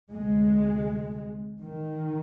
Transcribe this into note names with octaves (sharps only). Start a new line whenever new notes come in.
D2 C3 G#3
D#3